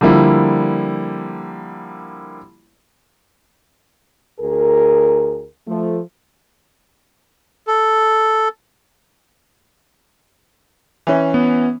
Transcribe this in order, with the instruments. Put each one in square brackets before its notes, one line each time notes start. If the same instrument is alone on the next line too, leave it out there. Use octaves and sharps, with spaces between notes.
[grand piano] D3 F3 G3 A#3 E4
[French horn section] D2 G#4 A#4
F3 A3
[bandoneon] A4
[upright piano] E3 C#4
[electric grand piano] B3